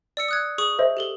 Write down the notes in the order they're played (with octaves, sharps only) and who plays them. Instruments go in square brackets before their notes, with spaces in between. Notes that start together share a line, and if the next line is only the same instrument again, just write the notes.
[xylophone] D5 E6 C#7
D#6 F#6 G#6
G#4 C#6 D#6
[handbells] C5 D#5 E5
[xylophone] G4 A4 G7